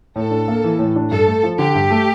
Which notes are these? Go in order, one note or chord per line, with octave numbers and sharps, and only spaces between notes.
A2 A4
D4
A#3
E3
A2
D4
G2 A4
A3
F3
D3 G4
G2
A3